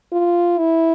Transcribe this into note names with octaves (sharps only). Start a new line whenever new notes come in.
F4
E4